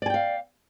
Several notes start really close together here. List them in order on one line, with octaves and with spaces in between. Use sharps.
D5 G#5 G5 F5